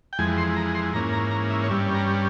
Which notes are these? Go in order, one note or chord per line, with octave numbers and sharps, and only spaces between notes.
G5
F2 E3 G#3 G#5
C6
A#5
C6
G#2 E3 A#3 C#4 A#5
A#5
A#5
E5
C#5
G2 G3 C#4 E5
A#5